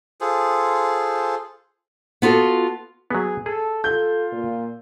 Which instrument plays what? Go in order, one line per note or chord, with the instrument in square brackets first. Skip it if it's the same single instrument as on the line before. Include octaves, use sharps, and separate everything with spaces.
[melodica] F4 G#4 A4 C5
[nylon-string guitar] B3 F4 F#4 A4
[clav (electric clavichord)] F#3 B3 [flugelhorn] G#4
[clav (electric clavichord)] G#4 [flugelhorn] A4
[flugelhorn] F4 [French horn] A4 [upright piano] G6
[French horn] A#2